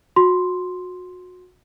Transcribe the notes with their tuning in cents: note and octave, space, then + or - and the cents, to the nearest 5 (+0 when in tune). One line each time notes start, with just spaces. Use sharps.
F#4 -30 C6 +0